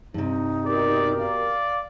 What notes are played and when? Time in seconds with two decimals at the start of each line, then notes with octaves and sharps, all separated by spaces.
0.14 G2 C3 D#4
0.66 B2 G4 A#4 D5
1.19 D5 F5